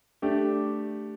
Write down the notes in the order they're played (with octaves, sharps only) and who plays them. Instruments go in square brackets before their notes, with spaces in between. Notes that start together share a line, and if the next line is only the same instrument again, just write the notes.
[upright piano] A3 D4 G4